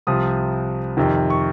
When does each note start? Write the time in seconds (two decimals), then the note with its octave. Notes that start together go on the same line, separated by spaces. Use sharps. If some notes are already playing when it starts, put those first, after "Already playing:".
0.07 C2 C3 F3 D#6
0.97 F2 C3 D#3
1.30 C#6